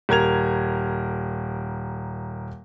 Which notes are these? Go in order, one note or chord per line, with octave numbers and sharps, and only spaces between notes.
D#1 A#4 G#6 F7